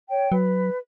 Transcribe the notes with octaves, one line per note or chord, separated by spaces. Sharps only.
C#5 G5
F#3 B4